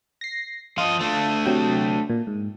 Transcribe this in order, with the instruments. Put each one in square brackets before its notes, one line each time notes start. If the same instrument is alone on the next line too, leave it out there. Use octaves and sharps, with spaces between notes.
[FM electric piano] A#6 C7
[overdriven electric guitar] F3 D#5 [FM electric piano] F4
[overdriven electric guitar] A3 D4
[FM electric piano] C3 F#3 G5
A#2
G#2